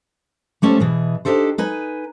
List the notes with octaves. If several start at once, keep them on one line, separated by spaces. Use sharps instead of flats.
G3 A3 C#4 A4 A#4 C5
B2 E3 G#4
D4 D#4 G4 A4 C5
D#4 B4 G#5